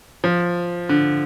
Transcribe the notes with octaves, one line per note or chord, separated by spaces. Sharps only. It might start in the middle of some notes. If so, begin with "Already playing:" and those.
F3
D3